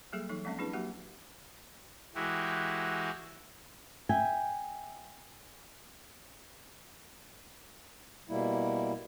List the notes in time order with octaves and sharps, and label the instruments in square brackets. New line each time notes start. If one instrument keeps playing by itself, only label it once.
[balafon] F#3 G3 A#3 G#4 A4 E5
E3 F#3 D#4 A4
F3 G#3 A#3 C4 C#4 E5
C4 D4 E4 G#4 B4
F#3 A#3 F#4 G4 E5 F#5
[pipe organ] E3 G#3 E4 F#4 G4
[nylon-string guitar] E5 G5 G#5
[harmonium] B2 G3 A#3 E4